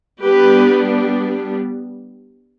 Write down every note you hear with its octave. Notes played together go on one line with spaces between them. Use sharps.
G3 B3 D4 G4 B4